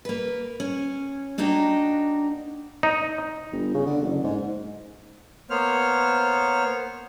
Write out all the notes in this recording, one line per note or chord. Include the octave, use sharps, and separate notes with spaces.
A#3 B4
C#4
A#3 D4 D#4 F#4 G5
D#4
G1
C#3
D3
F#1
G#2
A#3 B3 C5 C#5 F6